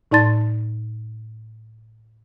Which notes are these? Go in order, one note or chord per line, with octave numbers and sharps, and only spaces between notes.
A2 D#4 D5 A5 C6 A6